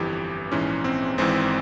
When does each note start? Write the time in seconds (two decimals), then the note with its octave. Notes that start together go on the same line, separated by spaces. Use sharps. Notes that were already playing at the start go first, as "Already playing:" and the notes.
Already playing: G1 F2 E3 G4
0.52 A#1 G#2 E3 C#4
0.84 C4
1.18 G#1 G#2 E3 C4